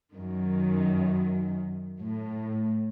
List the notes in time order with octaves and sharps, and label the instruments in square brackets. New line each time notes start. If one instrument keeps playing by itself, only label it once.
[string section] F#2 D#3
A2